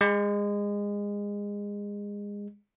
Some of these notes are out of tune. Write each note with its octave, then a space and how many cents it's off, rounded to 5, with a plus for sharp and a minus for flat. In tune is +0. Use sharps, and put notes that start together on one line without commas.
G#3 -25